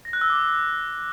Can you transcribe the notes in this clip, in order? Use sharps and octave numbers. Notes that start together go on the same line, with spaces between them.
A#6
F#6
E6
D6